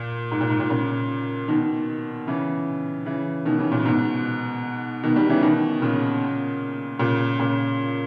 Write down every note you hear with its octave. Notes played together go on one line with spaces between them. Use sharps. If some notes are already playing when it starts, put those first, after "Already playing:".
Already playing: A#2
G#2
A#2
G#2
A#2
A#2 C#3
B2 D#3
C#3 E3
C#3 E3
B2 D#3
C#3 E3
A#2
G#2 B2
B2 D#3
D#3 G3
C#3 E3
B2 D#3
A#2 C#3
A#2 C#3
A#2 C#3